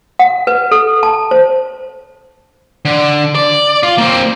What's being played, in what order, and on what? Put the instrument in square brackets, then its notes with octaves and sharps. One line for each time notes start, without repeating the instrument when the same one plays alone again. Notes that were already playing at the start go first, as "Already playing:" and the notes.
[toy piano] F#5
B4
A4
A5
C5
[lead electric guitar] D3
D5
F4
A#3 C4